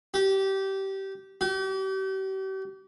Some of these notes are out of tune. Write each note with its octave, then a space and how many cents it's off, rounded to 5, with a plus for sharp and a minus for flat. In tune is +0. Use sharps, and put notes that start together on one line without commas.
G4 -20
G4 -40